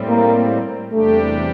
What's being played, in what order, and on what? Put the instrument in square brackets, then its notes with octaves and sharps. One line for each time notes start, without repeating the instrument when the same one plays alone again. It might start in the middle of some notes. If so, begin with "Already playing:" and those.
Already playing: [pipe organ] A2 G3 C4
[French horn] A#3
[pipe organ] E2 C3 G3 D4 G4 [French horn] A3